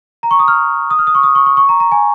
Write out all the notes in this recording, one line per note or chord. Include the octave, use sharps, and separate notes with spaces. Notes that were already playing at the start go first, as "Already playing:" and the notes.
A#5
C#6
D#6
F6
D#6
F6
D#6
C#6
D#6
C#6
C#6
C#6
A#5
A#5
G#5